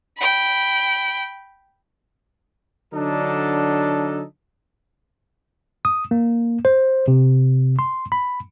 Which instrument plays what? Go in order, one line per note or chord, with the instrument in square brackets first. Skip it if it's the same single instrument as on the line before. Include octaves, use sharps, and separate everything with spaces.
[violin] G5 B5
[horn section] D3 F#3 D4 D#4 A4
[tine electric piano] D#6
A#3
C5
C3
C6
B5